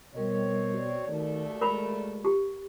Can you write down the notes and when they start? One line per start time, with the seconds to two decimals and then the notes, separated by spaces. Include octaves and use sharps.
0.14 B2 G3 C4 A#4 C#5 D#5
0.73 F#4 D5
1.07 D#2 D#3 A3
1.61 G#3 A#4 B5
2.25 G4